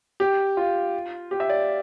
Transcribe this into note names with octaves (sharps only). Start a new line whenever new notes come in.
G4
F4
G4
E5
D5